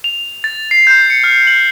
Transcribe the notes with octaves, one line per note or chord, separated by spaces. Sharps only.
F7
A6
C7
G6
C#7
F6
F#7